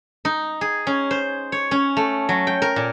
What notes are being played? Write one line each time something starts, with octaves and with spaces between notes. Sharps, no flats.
D#4
G#4
C#4
C5
C#5
C#4
A3
F#3
G5
A#4
A#2